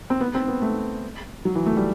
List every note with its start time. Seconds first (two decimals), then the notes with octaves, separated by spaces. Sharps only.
0.10 C4
0.20 B3
0.35 C4
0.48 B3
0.62 A3
1.45 F#3
1.55 E3
1.66 A3
1.77 G3